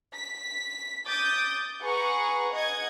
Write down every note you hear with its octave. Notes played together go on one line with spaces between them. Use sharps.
B6
D6 D#6 G6 A6
G#4 B4 F#5 A#5 C#6
D#5 F#5 G#6